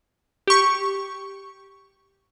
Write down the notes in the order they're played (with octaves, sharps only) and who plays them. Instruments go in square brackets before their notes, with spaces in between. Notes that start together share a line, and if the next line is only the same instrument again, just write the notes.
[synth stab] G4 C#6